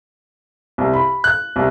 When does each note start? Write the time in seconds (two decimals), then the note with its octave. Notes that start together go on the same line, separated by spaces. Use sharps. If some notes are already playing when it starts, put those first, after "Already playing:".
0.78 C2
0.94 B5
1.24 F#6
1.56 C2